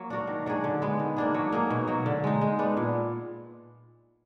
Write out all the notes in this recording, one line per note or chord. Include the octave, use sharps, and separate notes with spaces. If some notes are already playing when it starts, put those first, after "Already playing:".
Already playing: F#3 A#3
D4 F#4 A#4
D#3
F#3 D4 G#4
D3
G#3 B3
D#3
A#3 D4 G#4
F#3
A#3 D#4 G#4
B2
F#3 A#3
D3
G#3 D#4
G#3
B3 D4
A#2